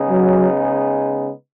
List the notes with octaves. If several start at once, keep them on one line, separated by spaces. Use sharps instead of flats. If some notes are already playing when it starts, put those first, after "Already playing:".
Already playing: C#3 G#3 B3 D#4
F#3